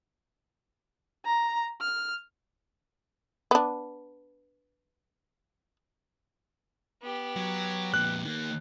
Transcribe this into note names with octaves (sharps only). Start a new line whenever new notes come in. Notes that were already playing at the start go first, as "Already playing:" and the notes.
A#5
F6
B3 D4
B3 G4
F#3
F2 A#2 F#6
D#3 A#3